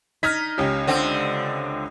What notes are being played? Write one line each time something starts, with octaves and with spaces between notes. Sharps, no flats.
D#4 F6 G#6 B6
C#2 C#4 G4
D3 C4